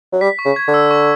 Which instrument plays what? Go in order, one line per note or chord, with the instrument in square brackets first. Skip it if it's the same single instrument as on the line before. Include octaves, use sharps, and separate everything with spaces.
[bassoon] F#3
[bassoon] G3 [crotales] B6
[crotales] C#6
[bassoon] C#3
[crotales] G#6
[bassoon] D3
[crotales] E6
C#6